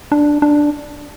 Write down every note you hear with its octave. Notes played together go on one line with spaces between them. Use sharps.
D4
D4